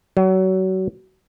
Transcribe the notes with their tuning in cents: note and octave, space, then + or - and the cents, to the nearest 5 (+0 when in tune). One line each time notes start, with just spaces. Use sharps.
F#3 +30